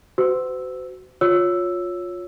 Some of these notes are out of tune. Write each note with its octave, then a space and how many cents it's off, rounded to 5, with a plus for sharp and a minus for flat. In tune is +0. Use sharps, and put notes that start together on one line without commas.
F#4 +20 C5 -45 E6 -5
F4 +25 C#5 +0 E6 +0